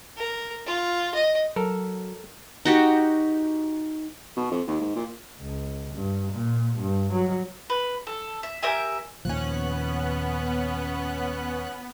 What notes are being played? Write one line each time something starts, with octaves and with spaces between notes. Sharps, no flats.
A#4
F4
D#5
F#3 A4 A#4
D#4 F#4 G4
B2
F2
D#2
G#2
A#2
C#2
G2
A#2
G2
F#3
B4
A4
E5
G4 A#4 E5 G#5
D#2 A#2 F3 B3 C#4 F#6